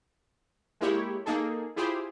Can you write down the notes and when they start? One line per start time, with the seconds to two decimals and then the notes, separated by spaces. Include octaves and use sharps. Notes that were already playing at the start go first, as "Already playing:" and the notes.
0.81 G#3 A#3 E4 G4 C#5
1.26 A#3 D#4 G#4 A4
1.76 E4 F4 G4 G#4 C5